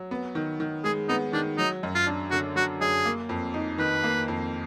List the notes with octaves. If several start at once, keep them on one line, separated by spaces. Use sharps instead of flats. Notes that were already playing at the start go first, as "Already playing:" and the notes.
Already playing: F#3
B3
D#3
D#3
G#3 G#4
B3 D#4
D#3 D4
F#3 D#4
F#2
F4
D4
D3 F#4
F#3 F#4
F#2 G#4
A#3
F2
D#4
D#3 B4
A#3
F2